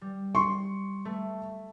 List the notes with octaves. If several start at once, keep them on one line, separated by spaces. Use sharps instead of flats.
G3
C6 C#6
A3